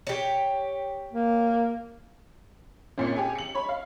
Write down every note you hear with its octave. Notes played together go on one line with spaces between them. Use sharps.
G4 C#5
A#3
G#1 A#2 C#4 C#7
G4 G#4 G#5
C#7 F#7
C#5 B5
F5